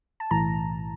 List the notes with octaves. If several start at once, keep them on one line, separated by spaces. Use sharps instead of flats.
A5
B1 A2 E3 A#5